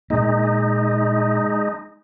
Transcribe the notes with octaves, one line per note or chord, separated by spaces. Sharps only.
A#2 G#3 A#3 D#4